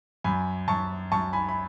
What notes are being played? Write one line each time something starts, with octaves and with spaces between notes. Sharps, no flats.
F#2 G#5 B5
F#2 A5 C#6
F#2 A5 C#6
G#5 B5
B5